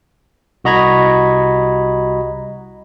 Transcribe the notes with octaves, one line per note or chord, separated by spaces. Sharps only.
C2 F#4 D#5 A#5 B5 G#6